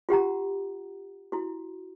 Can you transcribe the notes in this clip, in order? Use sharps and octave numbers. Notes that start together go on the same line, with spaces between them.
F4 G4 F#5 A#5
E4 F#4